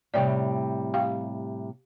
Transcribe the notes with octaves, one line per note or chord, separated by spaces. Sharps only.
A2 C3 G3 D5 G5
G4 F5 G5